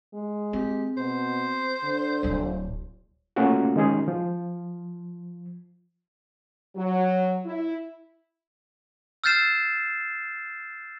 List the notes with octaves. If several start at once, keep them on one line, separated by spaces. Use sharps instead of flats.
G#3
C4 G4
B2 C5
D3
D1 F#3
A3 A#3 C#4 F4 F#4
D#3 G#3 C#4 G#4
F3
F#3
E4
E6 F6 G6 A6 C7 E7